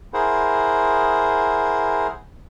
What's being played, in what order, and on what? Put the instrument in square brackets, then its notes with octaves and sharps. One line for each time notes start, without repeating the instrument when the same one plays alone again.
[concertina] E4 G#4 A#4 C5 F#5